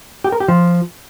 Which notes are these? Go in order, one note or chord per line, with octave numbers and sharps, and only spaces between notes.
G4
A#4
G4
F3